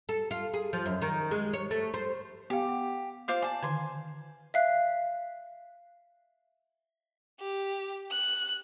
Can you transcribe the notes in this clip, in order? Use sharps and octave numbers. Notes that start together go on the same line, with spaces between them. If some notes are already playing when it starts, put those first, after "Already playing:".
A4
F4
G#4
F3
F#2
D#3
G#3
C#5
A3
C5
B3 G4 F5
F#5
F4 C5 D6
D5 G#5 A5
D3 D#3 G#5 C6
E5 F5 F#6
G4
F#6